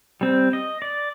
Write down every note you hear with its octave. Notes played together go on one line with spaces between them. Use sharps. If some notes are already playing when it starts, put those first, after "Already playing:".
G3 C4
D#5
D5